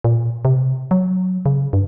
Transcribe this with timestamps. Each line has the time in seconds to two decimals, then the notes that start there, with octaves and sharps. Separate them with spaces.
0.04 A#2
0.45 C3
0.91 F#3
1.46 C#3
1.73 G2